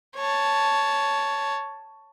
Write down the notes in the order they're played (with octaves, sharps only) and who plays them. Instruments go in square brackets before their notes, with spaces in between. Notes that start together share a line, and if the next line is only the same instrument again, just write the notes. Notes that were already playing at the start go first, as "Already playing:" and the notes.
[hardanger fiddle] C#5 A5